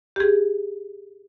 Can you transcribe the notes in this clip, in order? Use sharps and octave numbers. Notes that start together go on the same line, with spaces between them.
G4 G#4